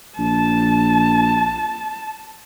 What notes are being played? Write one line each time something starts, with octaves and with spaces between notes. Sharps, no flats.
A#1 A5